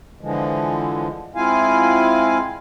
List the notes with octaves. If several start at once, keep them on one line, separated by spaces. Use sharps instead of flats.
D3 E3 F3 G#3
G#3 C4 E4 F4 F5 G#5